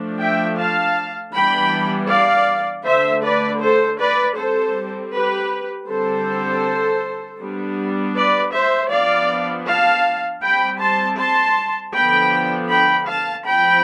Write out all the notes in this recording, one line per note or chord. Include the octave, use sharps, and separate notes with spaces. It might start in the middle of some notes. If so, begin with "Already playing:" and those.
Already playing: F3 A3 D4
E5 G5
F5 A5
E3 G3 B3 D4 G5 B5
D5 F5
D3 A3 D4 C5 E5
B4 D5
A4 C5
B4 D5
G3 C4 A4 C5
G4 B4
D3 G3 C4 A4 C5
G3 B3 D4
B4 D5
C5 E5
F3 B3 D4 D5 F5
F5 A5
G3 C4 G5 B5
A5 C6
A5 C6
D3 F3 B3 D4 G5 B5
G5 B5
F5 A5
F3 C4 G5 B5